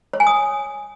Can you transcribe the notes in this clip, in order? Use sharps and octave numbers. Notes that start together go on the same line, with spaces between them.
C#5
G#5
D#6